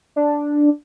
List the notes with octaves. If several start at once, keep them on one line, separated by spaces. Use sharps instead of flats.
D4